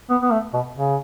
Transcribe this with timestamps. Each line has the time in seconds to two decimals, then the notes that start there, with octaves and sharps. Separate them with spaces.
0.10 B3
0.22 B3
0.31 A3
0.54 B2
0.76 C#3